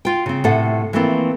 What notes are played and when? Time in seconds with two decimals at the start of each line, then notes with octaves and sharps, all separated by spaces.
0.05 F4 G5
0.26 C#3 C4
0.44 A2 C3 A3 A4 F#5
0.93 E3 F3 A3 A#3 C4 E4